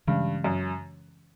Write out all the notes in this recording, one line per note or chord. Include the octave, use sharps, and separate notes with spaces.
G2 C#3 E3 G#3 C#4
F#2